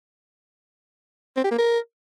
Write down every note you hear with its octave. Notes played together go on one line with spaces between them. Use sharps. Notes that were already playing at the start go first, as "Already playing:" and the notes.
C4
G4
A#3
A#4